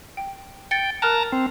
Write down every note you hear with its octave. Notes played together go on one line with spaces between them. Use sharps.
G5
G5 A6 C#7
A#4 A5 A#5 F6 F#6
C4